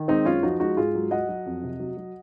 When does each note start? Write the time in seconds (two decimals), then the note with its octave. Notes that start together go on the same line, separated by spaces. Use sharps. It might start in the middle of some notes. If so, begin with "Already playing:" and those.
Already playing: D#3
0.08 G#3 C4 D#4
0.25 F#2 C#4 F4
0.43 F3 D#4 F#4
0.60 G#3 D#4 F#4
0.77 G#2 F4 G#4
0.95 F#3
1.11 F#3 D#5 F#5
1.29 F#3
1.46 F2
1.63 C3
1.80 F#3
1.97 F#3